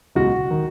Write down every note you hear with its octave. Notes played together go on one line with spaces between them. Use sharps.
C#2 B2 F#3 F#4
D#3